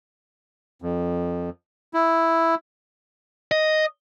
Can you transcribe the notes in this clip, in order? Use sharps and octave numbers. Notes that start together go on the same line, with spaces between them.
F2
E4
D#5